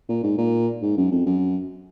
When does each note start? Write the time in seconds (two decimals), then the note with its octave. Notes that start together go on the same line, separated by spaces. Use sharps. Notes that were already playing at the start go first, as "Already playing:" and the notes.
0.09 A#2
0.23 G#2
0.38 A#2
0.82 G#2
0.97 F#2
1.11 F2
1.26 F#2